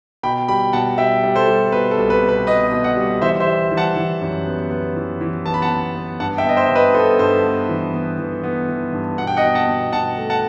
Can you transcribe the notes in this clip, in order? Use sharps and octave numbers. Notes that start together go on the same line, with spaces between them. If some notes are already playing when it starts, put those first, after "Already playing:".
B2 G5 B5
G3 G5 B5
B2 F#5 A5
G3 E5 G5
G3
A4 C5
G3
B2 B4
A4
C2
B4
B2
B4
B3 B4 D#5
B2
D#5 F#5
G3
E3 C5 E5
C5 E5
G3
E3
F#5 A5
E3
F#2
B3
B3
E3
E3
B3 A5
B5
F#5 A5
B3
B3
G2 F#5 A5
E5 G5
B3 D#5
C5 E5
G2
B4 D#5
B3 A4 C5
G2 A4 C5
B3
E3
B3
E3
B3
E3
G2
B2 F#5
G5
D#5 F#5
B2
F#5 A5
B2
B2 F#5 A5
A3
F#5 A5